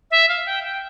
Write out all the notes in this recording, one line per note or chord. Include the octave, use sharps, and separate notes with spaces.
E5
F5
G5
G5